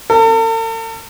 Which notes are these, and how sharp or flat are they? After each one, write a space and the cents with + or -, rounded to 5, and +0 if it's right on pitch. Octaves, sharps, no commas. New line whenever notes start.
A4 +45